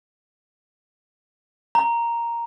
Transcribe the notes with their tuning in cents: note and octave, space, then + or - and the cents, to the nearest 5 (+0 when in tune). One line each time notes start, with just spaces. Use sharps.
A#5 +0